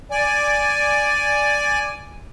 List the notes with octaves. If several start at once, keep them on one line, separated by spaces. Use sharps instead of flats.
D5 G#5